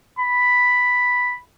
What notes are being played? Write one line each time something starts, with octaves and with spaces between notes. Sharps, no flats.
B5